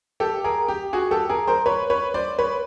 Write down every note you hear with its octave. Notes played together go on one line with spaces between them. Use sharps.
G4 A4
G#4 A#4
G4
F#4 G#4
G4 A4
G#4 A#4
A#4 C5
B4 C#5
B4 C#5
C5 D5
B4 C#5